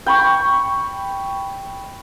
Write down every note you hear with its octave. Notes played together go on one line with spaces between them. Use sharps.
G5 B5 C#6